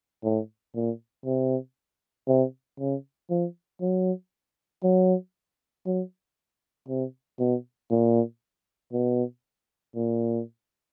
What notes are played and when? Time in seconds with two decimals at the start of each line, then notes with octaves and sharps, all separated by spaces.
0.24 A2
0.75 A#2
1.26 C3
2.28 C3
2.79 C#3
3.30 F3
3.81 F#3
4.84 F#3
5.86 F#3
6.88 C3
7.39 B2
7.90 A#2
8.92 B2
9.95 A#2